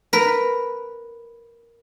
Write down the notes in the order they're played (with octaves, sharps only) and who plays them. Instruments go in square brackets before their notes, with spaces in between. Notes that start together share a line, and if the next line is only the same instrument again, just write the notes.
[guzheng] A#4 B4